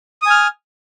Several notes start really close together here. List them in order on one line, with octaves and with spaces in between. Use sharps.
D#6 G#5 F6